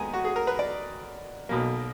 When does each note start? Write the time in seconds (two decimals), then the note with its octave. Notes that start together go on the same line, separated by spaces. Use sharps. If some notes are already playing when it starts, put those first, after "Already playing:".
Already playing: D#2 D#3 G#3 B3 G#5 A#5
0.13 F#4
0.25 G#4
0.36 A#4
0.47 B4
0.59 D5
1.49 B1 B2 A#3